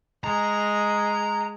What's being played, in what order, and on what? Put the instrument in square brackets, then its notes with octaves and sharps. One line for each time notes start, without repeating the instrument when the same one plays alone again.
[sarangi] G#3 [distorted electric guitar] A#5